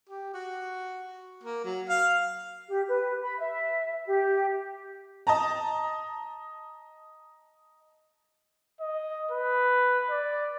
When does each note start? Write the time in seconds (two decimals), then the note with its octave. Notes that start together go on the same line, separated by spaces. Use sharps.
0.09 G4
0.34 F#4
1.43 A#3
1.65 F#3
1.89 F5
2.69 G4
2.88 B4
3.22 B5
3.38 E5
4.05 G4
5.27 D#5 A5 A#5
8.81 D#5
9.31 B4
10.10 D5